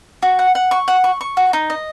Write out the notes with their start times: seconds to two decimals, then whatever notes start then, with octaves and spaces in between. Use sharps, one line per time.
0.22 F#4
0.39 F#5
0.55 F#5
0.71 C#6
0.88 F#5
1.04 C#6
1.21 C#6
1.37 F#4
1.53 D#4
1.70 D#5